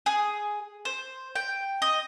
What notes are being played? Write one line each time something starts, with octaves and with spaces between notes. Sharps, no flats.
G#4
C5
G5
D#5